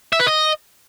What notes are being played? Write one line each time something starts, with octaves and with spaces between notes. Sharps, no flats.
E5
B4
D#5